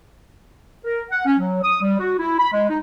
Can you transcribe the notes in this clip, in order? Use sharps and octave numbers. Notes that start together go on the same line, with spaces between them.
A#4
F#5
C#4
F#3
D#6
G3
F#4
E4
B5
G#3
D#4